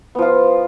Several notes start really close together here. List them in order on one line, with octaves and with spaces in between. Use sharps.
B3 F3 F4